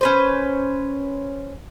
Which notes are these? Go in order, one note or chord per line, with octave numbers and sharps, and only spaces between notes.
C#4 B4 C5